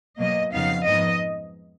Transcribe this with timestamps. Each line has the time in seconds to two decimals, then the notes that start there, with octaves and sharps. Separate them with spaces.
0.19 B2 F#3 A#3 D#5
0.53 F2 C#3 F#3 B3 D#4 F5
0.86 G#2 F3 G#3 B3 D#4 D#5